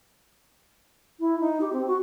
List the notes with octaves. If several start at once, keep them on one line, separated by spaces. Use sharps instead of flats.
E4
D#4
G4
C4
F#4